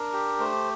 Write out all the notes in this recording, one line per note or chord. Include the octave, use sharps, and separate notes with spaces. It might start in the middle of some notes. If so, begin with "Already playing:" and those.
Already playing: D4 A#4
G4
A3 C5